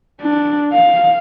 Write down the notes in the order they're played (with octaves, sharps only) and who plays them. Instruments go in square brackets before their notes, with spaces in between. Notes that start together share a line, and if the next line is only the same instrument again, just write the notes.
[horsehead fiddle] D4
F5